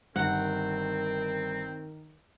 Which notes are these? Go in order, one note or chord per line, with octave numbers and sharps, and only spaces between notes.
G1 D#3 C4 A#4 F#5